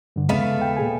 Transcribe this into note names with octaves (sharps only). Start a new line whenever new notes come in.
G2 D3
D#2 C#3 G#3 A3 B3 F5
G5
A#2 G#4 G#5